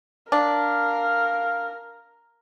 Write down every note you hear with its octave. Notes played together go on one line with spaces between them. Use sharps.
D4 A#4 F5